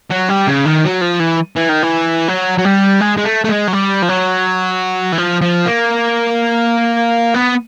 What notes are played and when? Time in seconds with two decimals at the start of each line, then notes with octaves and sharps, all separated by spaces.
0.11 F#3
0.29 G3
0.47 C#3
0.66 D#3
0.84 F#3
1.01 F3
1.20 E3
1.56 E3
1.69 D#3
1.83 E3
2.28 F#3
2.58 F#3
2.65 G3
3.01 G#3
3.17 G#3
3.25 A3
3.44 A3
3.49 G#3
3.68 F#3
3.73 G3
4.02 F3
4.09 F#3
5.12 E3
5.18 F3
5.41 F3
5.66 A#3
7.34 B3